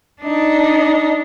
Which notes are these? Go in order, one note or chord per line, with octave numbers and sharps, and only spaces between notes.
D4 D#4